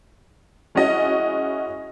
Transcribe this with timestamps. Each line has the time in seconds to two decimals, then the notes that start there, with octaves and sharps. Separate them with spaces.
0.75 G#3 C#4 E4 F#4 D#5